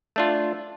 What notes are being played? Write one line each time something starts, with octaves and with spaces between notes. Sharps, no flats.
A3 D4 F4